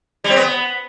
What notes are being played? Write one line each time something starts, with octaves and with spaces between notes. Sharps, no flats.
G3
C4
B3